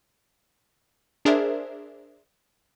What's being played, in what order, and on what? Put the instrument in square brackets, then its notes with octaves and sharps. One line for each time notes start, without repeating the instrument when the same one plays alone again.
[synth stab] D4 G#4 A#4 C5 D5 E5